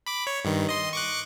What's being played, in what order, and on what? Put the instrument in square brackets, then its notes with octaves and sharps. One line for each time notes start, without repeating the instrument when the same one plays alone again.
[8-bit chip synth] B5 D6
C#5
G2 D#3
D#5 C6
C#6 D6 F#6